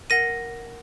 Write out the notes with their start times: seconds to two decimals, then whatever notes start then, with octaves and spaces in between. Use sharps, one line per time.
0.10 A#4 F#5 A#6 D#7